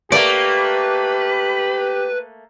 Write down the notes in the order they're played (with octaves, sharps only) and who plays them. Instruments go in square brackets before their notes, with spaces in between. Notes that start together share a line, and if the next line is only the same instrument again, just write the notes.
[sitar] A3 A#3 [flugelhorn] G4 [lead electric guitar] B4 [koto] D5